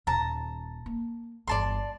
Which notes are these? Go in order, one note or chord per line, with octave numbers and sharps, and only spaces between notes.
D#1 D#3 A5 A#5
A#3
G1 E2 D5 A5 C6